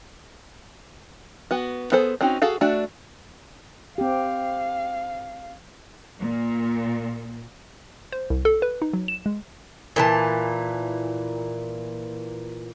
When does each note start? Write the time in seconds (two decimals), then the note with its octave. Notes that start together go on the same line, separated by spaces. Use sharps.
1.51 B3 F#4
1.92 B3 G#4 A4 C5
2.21 C4 C#4 D#4 F#4
2.42 F#4 G#4 A4 F5
2.61 A3 D4 F#4
3.98 C4 G4 F5
6.20 A#2
8.12 C5
8.30 C2
8.45 A4
8.62 B4
8.82 D#4
8.93 F#3
9.08 E7
9.26 G#3
9.96 A#2 E3 A5